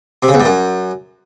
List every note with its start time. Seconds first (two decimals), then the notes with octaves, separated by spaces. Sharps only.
0.23 C3
0.28 C#3
0.34 E2
0.40 G2
0.45 F#2